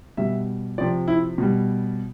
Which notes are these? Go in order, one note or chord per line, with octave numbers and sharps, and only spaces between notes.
B2 G3 E5
C3 F3 D5
E4
B2 G3